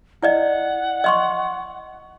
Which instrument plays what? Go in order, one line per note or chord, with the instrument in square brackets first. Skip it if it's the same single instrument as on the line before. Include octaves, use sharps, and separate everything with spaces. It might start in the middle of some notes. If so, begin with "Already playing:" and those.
[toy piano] E4 D5 D#5 [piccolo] F#5
[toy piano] D#5 C6 C#6